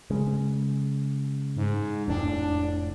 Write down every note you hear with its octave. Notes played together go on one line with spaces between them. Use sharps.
C#3 G#3
G#2
F1 F2 A2 D4